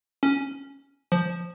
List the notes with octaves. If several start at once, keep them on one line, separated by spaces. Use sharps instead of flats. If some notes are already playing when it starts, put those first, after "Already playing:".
C#4
F3